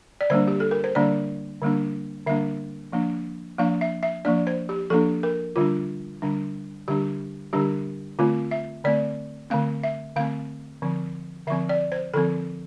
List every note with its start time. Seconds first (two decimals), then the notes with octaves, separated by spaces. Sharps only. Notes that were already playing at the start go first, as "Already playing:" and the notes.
0.21 D5
0.30 D3 G3 A#3 D4 C5
0.47 G4
0.60 A4
0.71 A#4
0.84 C5
0.95 D3 G3 A#3 D4 D5
1.62 D3 G3 A#3 D4
2.27 D3 G3 A#3 D4 E5
2.92 F3 A#3 D4
3.58 F3 A#3 D4 F5
3.81 E5
4.03 E5
4.25 F3 A#3 D4 D5
4.47 C5
4.69 G4
4.90 F3 A#3 D4 A4
5.23 A#4
5.56 D3 G3 D4 F4
6.22 D3 G3 D4
6.88 D3 G3 D4 G4
7.53 D3 G3 D4 G4
8.19 D3 A3 C4 F4
8.51 E5
8.84 D3 A3 C4 D5
9.50 D3 A3 C4 F5
9.83 E5
10.16 D3 A3 C4 F5
10.82 D3 F3 C4
11.47 D3 E5
11.50 F3 C4
11.69 D5
11.92 C5
12.14 D3 F3 C4 A4